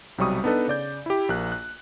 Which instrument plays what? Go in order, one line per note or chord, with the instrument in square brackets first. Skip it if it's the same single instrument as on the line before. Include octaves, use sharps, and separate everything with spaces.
[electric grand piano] B1 C3 F#3 G3 C#6 D#6
B3 D4 D#4 A4 B4
C#3 D5 G6
E4 G4
A#1 A#3 F#6
F#6